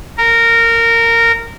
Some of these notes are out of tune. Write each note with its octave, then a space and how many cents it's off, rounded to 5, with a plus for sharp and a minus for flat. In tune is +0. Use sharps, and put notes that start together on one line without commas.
A#4 -15